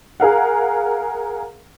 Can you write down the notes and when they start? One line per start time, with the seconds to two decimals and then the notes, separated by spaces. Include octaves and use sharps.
0.20 G#4 A#4 F5 F#5